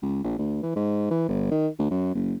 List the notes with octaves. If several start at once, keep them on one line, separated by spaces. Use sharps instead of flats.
C#2
A#1
D2
E3
G#2
E3
G1
D#3
D2
F#2
F#1